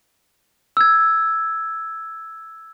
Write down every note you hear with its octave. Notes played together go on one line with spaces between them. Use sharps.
E6 G#6